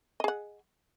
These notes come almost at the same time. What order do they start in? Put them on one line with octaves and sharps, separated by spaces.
D#5 G#4 F#5